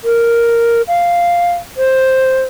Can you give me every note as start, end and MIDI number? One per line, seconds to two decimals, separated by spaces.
0.05 0.82 70
0.88 1.53 77
1.77 2.42 72